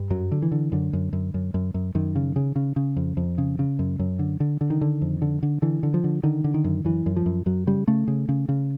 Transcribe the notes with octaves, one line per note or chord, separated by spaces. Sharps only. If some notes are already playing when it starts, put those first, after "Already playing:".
Already playing: G2
F#2 F#3
D3
E3
D3
F#2 D3
F#2
F#2
F#2
F#2
F#2
F#2 D#3
C#3
C#3
C#3
C#3
F2
F2
C#3
C#3
F#2
F#2
D3
D3
D3
D#3
D3
F2
D3
D3
D3 E3
D3
F3
D3
D3 D#3
D3
D#3
F#2
F#2 E3
F#2
F3
F#2
F#2 F#3
C#3 G3
C#3 A3
C#3
C#3
C#3